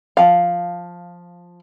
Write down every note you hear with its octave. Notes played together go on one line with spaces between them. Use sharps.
F3 F5